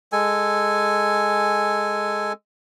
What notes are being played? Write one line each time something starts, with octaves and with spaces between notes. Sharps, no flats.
G#3 A4 G#5